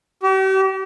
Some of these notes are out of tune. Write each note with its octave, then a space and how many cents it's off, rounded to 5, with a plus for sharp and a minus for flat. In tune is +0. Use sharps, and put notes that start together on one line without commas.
G4 -40